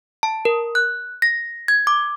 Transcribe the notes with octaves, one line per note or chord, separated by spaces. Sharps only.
A5
A#4
F#6
A#6
G#6
D6